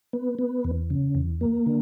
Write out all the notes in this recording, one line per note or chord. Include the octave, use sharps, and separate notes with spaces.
B3
B3
E2
C#3
E2
A#3
D3